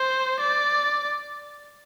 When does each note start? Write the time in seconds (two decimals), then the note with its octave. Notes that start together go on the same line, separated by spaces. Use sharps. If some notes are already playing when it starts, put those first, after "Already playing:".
Already playing: C5
0.40 D5